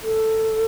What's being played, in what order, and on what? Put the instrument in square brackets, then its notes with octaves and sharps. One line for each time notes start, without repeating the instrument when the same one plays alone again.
[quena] A4